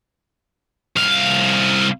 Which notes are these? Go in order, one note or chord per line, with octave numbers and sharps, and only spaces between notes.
C2 F5